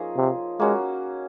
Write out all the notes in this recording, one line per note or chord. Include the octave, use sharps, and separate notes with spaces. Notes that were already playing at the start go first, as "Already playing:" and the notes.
Already playing: F3 A#3 C#4 D#4 F4 G#4
C3
G#3 A#3 C#4 F#4